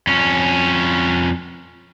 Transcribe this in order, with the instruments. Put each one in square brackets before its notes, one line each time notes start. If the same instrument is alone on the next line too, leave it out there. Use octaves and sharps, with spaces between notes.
[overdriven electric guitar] F2 C#4